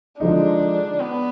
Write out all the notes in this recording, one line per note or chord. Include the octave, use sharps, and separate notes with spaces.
D3 F3 G#3 D4 D#4
B3